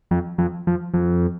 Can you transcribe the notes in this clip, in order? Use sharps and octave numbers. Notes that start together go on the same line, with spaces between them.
F2
F2
F2
F2